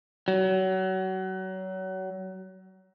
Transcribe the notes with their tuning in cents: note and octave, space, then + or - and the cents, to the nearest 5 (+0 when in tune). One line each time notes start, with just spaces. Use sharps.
F#3 +30